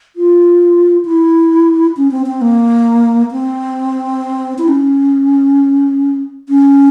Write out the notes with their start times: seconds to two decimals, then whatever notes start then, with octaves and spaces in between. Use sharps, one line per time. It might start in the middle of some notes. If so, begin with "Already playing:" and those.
0.16 F4
1.05 E4
1.97 C#4
2.11 C4
2.26 C4
2.41 A#3
3.32 C4
4.58 E4
4.68 C#4
6.49 C#4